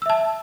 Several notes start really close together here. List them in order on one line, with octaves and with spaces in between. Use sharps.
E6 E5 A5